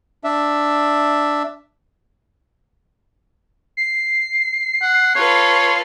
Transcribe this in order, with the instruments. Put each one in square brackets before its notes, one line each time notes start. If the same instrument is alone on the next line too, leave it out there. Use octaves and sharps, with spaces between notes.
[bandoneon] D4 E5
[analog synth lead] C7
[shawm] F#5
[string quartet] F4 A4 B4 [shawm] C#5